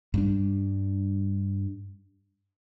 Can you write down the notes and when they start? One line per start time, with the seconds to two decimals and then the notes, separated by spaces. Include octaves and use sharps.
0.14 G2 G3 D4